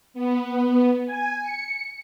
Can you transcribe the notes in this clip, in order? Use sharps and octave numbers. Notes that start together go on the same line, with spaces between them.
B3
G#5
C#7